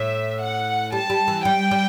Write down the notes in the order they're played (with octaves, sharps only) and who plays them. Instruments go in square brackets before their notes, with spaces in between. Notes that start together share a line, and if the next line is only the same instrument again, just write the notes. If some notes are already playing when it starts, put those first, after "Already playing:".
Already playing: [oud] A2 [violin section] E5
[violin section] F#5
[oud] G3 [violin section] A5
[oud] G3
E3
[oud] G3 [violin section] G5
[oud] G3